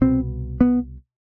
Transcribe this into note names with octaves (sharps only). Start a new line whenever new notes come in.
C2 B2 C4
B3